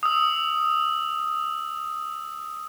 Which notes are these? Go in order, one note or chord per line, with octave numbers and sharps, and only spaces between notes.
D#6 E6